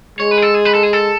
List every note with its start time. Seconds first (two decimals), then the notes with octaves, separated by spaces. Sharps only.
0.19 G#3 C#5
0.31 B4
0.38 G#4
0.42 A4
0.54 G#4
0.65 B4
0.75 A4
0.83 G#4
0.93 A4